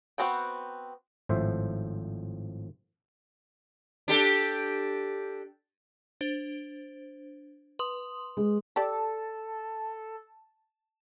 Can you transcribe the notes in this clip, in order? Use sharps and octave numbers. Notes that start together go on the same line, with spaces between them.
B3 C4 F#4 G5
G#1 A2 F3 C5 E5
D4 G4 A4
D4 C5
B4 C6 D#6
G#3
G4 A4 D5 A5